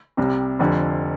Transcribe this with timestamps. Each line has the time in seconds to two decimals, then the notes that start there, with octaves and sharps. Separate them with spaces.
0.17 C2 C3 G3
0.59 F1 F2 D3